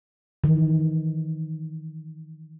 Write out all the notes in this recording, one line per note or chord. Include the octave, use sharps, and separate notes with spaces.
D#3 E3